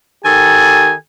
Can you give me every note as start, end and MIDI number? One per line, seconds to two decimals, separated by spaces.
0.23 0.93 51
0.23 0.93 67
0.23 0.93 69
0.23 0.93 80